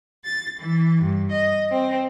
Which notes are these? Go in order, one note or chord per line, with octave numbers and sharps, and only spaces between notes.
A6
E3
G2
D#5
C4